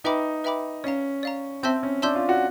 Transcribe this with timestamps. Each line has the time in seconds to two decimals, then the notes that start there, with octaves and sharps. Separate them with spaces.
0.04 D#4 B4 E5 G5 B5 D6
0.44 B4 E5 G5 B5 D6
0.84 C#4 D5 F5 A#5
1.23 D5 F5 A#5
1.63 C4 E5 A5 C6 E6 G6
1.83 C#4
2.02 D4 E5 A5 C6 E6 G6
2.16 F4
2.29 F#4